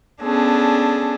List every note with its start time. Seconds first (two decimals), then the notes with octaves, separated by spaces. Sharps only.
0.21 B3 C#4 D4 G#4 A4